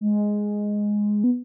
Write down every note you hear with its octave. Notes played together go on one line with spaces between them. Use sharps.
G#3
B3